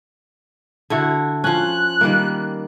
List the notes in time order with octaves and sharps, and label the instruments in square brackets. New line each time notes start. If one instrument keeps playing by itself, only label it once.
[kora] D3 E4 F#4
[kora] F3 C#4 [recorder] F#6
[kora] D#3 G3 A#3